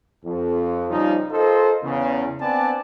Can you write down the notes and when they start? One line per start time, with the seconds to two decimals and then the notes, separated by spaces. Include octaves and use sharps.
0.24 F2
0.89 C#3 F3 G3 D#4
1.31 F4 A4 A#4 C5 D#5
1.83 E2 C#3
2.40 B3 C4 D4 D5 G#5 A5